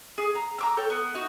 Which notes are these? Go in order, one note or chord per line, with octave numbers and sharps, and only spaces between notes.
G#4
A#5
A#5 D6 E6
A4 C#5 G5
B3
D#4 F#4